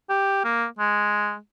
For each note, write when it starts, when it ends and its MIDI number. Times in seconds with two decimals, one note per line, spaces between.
0.09 0.40 67
0.44 0.66 58
0.79 1.37 56